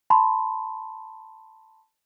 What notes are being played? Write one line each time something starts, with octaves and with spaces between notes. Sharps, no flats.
A5 B5 C6